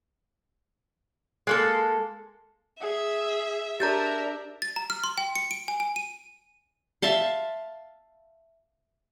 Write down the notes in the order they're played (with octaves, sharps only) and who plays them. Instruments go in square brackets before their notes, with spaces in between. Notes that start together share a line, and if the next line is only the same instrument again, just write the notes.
[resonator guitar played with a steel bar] G#3 A#3 A4
[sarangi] G#4 [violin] E5
[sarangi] D4 [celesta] G4 [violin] A#4 E5 [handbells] A#5 G6 A6
[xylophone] A6
A#5
F6
C6
G5
C#7
D7
G#5
G#5
D#7
[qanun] E5 F5 A5 C6